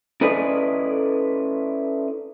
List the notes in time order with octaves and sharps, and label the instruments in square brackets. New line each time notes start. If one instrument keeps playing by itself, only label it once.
[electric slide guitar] C#4 E4 A4 B4 D5 D#5